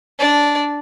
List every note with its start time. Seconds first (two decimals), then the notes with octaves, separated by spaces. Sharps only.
0.19 D4 D5